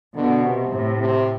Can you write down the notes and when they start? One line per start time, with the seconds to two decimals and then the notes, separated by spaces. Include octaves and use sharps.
0.16 B2 D3
0.44 C3
0.73 A2
1.00 C3